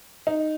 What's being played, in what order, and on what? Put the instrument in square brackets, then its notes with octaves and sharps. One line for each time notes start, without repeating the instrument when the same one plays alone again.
[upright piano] D#4